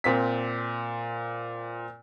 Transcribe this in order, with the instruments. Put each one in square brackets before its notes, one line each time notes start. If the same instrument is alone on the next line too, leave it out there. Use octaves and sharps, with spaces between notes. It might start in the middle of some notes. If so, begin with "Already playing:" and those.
[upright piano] A#2 C4 B6